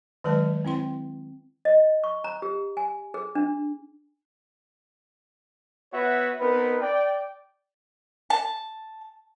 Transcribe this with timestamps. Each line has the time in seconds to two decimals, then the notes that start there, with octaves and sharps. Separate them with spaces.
0.24 D#3 F#3 G#3 B4 A5
0.64 C4 E4 G5 C6
1.65 D#5
2.04 C#6
2.24 A#5
2.42 G4
2.77 G#5
3.14 G#4
3.35 D4
5.93 B3 F#4 B4 C#5 E5 F#5
6.40 B3 C4 D#4 A#4 B4
6.81 D5 G5
8.30 A5